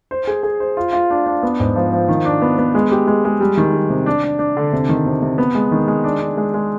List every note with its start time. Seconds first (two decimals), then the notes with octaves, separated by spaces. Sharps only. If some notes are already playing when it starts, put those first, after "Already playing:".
0.11 C5
0.27 G#4
0.43 G#4
0.60 C5
0.77 F4
0.93 F4
1.10 D4
1.26 D4
1.43 B3
1.60 G#2
1.76 F3
1.93 F3
2.08 D#3
2.25 D4
2.42 B3
2.58 B3
2.75 G#3
2.91 G4
3.07 G#3
3.25 G#3
3.41 G3
3.57 D#3
3.73 G3
3.90 C3
4.06 D4
4.24 D4
4.39 D4
4.57 D3
4.73 C3
4.89 D#3
5.06 C3
5.22 C3
5.38 B3
5.55 G#3
5.72 D#3
5.88 G#3
6.04 D4
6.21 D4
6.37 G#3
6.54 G#3